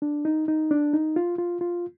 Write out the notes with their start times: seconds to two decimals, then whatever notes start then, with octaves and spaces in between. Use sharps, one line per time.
0.02 D4
0.25 D#4
0.48 D#4
0.71 D4
0.93 D#4
1.16 F4
1.38 F4
1.61 F4